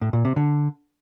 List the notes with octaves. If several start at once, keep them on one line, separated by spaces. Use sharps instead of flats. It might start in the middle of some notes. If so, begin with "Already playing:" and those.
A2
A#2
C3
D3